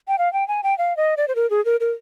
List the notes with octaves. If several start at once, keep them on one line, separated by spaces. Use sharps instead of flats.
G5
F5
G5
G#5
G5
F5
D#5
D5
C5
A#4
G#4
A#4
A#4